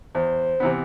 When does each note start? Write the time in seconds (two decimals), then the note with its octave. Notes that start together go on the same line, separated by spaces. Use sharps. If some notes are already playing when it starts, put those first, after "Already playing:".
0.15 E2 C5
0.60 C3 E3 B3